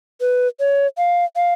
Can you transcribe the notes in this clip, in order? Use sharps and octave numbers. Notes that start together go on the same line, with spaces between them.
B4
C#5
F5
F5